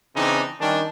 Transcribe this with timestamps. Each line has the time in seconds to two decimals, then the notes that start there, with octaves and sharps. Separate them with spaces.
0.16 C#3 E3 C4 D4 D#4
0.60 D#3 G3 C#4 D4